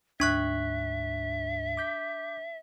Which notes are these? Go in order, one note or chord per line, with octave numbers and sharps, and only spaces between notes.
D2 G#2 D4 E5 C#6 F#6
D6 G6 B6